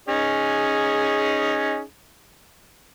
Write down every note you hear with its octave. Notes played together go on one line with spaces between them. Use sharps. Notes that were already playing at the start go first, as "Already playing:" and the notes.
C#4 D#4 G#4